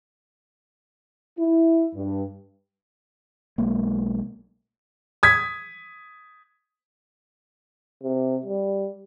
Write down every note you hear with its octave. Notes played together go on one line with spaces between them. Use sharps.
E4
G2
B1 G#3 A#3
D#6 G#6 B6
C3
G3